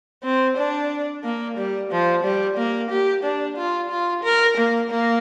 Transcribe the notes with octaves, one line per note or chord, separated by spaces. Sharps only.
C4
D4
A#3
G3
F3
G3
A#3
G4
D4
F4
F4
A#4
A#3
A#3